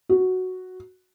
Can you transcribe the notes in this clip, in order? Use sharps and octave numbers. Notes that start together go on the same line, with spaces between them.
F#4